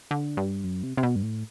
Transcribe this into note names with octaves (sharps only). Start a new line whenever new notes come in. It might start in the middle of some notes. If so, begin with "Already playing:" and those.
D3
G2
F#2
C3
C3
B2
G2
A2